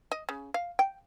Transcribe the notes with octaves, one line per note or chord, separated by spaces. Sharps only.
D#5
C#3
F5
G5